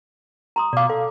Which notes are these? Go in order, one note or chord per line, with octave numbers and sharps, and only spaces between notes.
A#5 C6 D#6
B2 D5 F5 D6
A4 F5